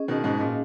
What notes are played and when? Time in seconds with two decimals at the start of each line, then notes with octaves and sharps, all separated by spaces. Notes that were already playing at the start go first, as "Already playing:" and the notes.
Already playing: C#4 G#4 D#5
0.08 B2 D#3
0.24 G#2 B2
0.40 A#2